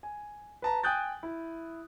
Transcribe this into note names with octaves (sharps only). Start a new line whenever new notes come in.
G#5
B4 A5 A#5
G5 G#5 D#6 F#6 G6 A6
E4